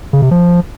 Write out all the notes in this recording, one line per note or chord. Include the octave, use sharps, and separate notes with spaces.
C#3
C3
F3